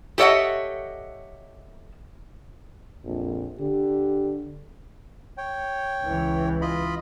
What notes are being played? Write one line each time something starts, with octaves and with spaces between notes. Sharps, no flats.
G4 A4 C#5 D#5 E5 F#5
A#1 F2
D3 G4
C#5 G5
C#2 E3
F4 D#5 B5